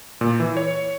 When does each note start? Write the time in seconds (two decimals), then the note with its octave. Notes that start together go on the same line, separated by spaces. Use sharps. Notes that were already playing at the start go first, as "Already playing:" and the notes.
0.21 A#2
0.40 E3
0.57 C#5